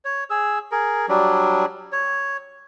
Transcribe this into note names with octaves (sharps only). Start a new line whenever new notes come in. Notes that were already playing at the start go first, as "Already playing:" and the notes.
C#5
G#4 E6
G#4 A#4
F#3 G3 D4
C#5